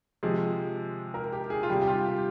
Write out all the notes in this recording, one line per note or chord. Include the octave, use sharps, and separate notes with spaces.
C3 F3 G#3 G#4
A#4
G4
G#4
F4
C3 G3 G4
G4
F4
G4